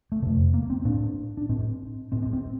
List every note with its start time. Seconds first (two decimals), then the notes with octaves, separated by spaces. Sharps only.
0.12 A3
0.22 F2 C3
0.54 A#3
0.70 C4
0.85 A2 D4
1.37 D4
1.49 A2 C4
2.12 A2 C4
2.22 C4
2.33 C4